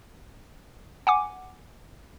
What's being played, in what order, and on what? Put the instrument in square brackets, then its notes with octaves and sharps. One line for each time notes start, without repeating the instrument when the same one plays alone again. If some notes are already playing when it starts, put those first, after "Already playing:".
[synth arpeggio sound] F#5 G#5 D6